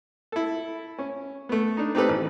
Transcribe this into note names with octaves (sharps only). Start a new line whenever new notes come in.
E4 A4
C#4
A3 B3
D4 D#4
C4 D#4 G4 A4 B4
A1